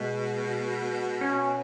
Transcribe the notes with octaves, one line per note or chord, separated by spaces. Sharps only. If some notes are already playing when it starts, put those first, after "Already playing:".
Already playing: B2 G#3
C#4